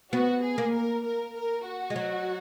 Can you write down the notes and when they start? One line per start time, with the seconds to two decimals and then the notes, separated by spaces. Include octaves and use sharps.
0.12 B3 F#4
0.43 G#4
0.58 A#3
0.73 A#4
1.04 A#4
1.34 A#4
1.65 F#4
1.90 G#3
1.96 F#3